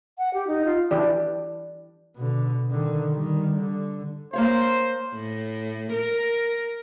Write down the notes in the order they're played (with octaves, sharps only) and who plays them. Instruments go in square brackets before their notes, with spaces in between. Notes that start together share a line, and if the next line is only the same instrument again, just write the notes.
[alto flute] F#5
G4
D#4
F4
[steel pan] E3 D4 G4 [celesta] D5
[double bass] B2 D3
D3 D#3
D#3 G3
D3
[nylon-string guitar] A#3 C#5 F5 [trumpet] C5
[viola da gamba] A2
A#4